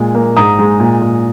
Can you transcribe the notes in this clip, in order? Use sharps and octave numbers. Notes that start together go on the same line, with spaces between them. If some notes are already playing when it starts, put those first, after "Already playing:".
Already playing: A#2 G#3
A#3
G#2 A#5 D#6
G#3
A#2
A#2